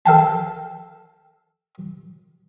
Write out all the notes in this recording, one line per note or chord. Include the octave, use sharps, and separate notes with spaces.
A4 F5 G5 A5